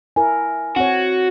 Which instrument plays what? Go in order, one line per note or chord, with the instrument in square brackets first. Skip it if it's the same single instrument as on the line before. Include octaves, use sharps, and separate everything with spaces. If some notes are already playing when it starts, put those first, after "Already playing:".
[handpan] E4 A#4 [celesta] G#5
[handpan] C4 C#5 [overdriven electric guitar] F#4